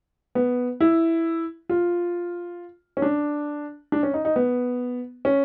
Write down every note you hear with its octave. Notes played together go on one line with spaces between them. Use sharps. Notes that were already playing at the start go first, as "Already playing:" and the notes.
B3
E4
F4
C#4
D4
D4
C#4
D#4
D#4
B3
C#4